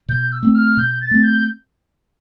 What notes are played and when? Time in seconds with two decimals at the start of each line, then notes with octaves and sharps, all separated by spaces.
0.09 B2 G6
0.32 E6
0.43 A3 C4
0.54 F6
0.77 B2 G6
1.01 A6
1.11 A3 C4
1.23 G6